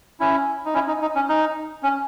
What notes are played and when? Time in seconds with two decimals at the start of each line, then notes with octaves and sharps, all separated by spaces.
0.20 C#4 E4
0.65 D#4
0.74 C#4 E4
0.88 D#4
1.02 D#4
1.15 C#4
1.29 D#4
1.83 C#4